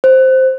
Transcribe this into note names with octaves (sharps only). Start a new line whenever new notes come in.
C5